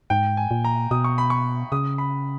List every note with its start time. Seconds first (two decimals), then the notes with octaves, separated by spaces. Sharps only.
0.10 G#2 G5
0.37 G#5
0.51 A#2
0.65 A#5
0.91 B2 D#6
1.04 C#6
1.18 B5
1.30 C#6
1.72 C#3 D#6
1.98 B5